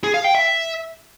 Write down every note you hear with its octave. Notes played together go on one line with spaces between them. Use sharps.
G#4
F5
G5
E5